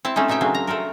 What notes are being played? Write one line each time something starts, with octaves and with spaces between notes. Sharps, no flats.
C4 E4 A5
A3 C4 C#4 D#4
B2 D#4 C#5 E5 G5
C#3 F#3 A#3 C4 D4
A#5
A3 C4 A4 A#4